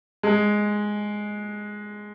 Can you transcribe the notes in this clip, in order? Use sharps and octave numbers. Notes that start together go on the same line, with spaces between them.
G#3